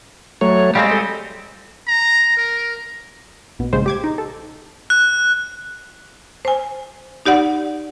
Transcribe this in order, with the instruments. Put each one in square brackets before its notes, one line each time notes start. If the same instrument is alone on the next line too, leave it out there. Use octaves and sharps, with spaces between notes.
[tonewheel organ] F#3 A3 C#5
[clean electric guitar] G3 G#3 C4 [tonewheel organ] F5
[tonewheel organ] A4 D#5
[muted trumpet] A#5
A#4
[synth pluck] A#1 B2
A#1 G2 C#3 G#3 C5
G4 D6 G#6
D#4
A4
[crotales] F#6
[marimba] C5 G#5
D#4 G4 D5 F#5